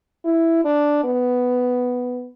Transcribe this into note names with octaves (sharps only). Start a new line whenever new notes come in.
E4
D4
B3